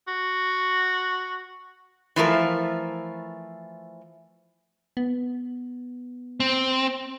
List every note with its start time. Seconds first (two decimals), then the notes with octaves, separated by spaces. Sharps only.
0.08 F#4
2.16 E3 F3 A3 A#4
4.97 B3
6.40 C4